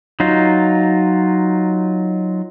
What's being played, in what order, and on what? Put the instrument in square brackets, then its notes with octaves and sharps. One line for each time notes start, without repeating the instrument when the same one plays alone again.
[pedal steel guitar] F#3 D#4 F4